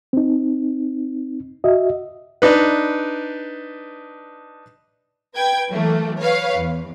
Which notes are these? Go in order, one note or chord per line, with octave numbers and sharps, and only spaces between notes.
C4 D#4
F#4 D#5 E5
D4 D#4 B4
B4 G5 G#6
E3 F#3 A3 A#3
B4 C#5 F5
E2